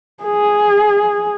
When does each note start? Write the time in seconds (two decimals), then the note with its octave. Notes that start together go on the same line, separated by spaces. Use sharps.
0.24 G#4